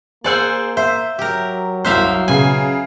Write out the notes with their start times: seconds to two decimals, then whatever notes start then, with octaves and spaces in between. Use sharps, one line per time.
0.24 A#3 G#4 C5 D5 F#5 G#5 E6
0.77 C5 E5
1.19 F#3 G4 A#4
1.85 C2 F#2 C5 E5 F5 F#6
2.28 C#3 B3 G#5